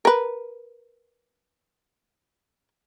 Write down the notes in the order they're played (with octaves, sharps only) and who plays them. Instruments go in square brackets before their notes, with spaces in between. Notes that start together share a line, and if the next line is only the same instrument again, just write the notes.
[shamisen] A#4 B4